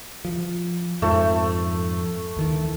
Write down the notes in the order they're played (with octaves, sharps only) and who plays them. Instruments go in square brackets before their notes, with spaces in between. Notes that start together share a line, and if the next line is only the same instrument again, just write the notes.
[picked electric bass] F3
[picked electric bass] F2 G#2 F3 [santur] A3
[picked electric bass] D2 D#3 E3